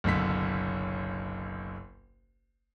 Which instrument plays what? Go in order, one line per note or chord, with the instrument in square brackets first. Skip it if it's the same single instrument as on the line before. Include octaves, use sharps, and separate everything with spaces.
[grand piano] F#1 B1 D3 B6